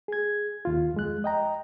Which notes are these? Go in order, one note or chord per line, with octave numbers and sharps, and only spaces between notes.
G#4 G#6
D#2 F4
F2 G#3 F#6
D#5 G5 A#5